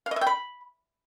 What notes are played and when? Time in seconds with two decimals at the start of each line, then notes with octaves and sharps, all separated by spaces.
0.06 F5
0.11 D#5
0.16 E5
0.21 G5
0.26 B5